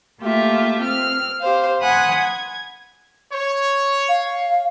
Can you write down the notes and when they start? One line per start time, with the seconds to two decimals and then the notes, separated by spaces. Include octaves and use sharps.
0.21 A3 A#3 F4 G4 E5
0.81 C4 F6
1.41 G4 C5 F5
1.82 F#5 G#5 B5 C6 D#6 F#6
2.19 G#6
3.33 C#5
4.09 F5